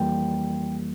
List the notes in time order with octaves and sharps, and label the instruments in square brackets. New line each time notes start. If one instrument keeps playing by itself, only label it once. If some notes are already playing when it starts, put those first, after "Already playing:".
Already playing: [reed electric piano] F2 E3 G3 A#3 G5